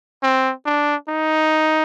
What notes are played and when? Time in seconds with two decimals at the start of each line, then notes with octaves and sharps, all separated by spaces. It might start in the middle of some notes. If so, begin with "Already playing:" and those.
0.23 C4
0.66 D4
1.08 D#4